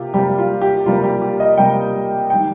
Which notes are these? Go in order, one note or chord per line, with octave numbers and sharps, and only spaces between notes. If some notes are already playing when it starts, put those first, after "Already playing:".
Already playing: C3 A#3 F4 G4
C3 G3 A#3 G4
F4
G4
C3 G3 A#3 F4
G4
G4
D#5
C3 G3 A#3 G5
D#3 G3 G5